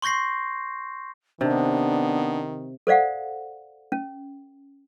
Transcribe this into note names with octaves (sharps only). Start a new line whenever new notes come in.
C6 C#6 G6 A#6 C7
C3 D#3 B3 D4
A4 C5 D5 F5 F#5
C#4